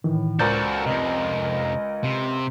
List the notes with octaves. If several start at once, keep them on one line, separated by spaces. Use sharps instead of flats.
A2 D#3 E3
C#2 F#4 A4 A#4 C5 D5 G6 A6
F2 C3 D#5
C3